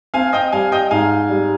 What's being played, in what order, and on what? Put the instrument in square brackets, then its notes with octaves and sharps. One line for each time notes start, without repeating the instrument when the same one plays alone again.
[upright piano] C4 [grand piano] F5 G#5
[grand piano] D#5 G5
[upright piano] G3 [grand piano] F5 G#5
[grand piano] D#5 G5
[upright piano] G#2 [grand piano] F5 G#5
[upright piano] G3